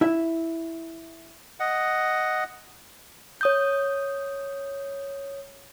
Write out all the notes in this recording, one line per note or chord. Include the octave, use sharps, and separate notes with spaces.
E4 E5
D#5 F#5
C#5 D#6 G6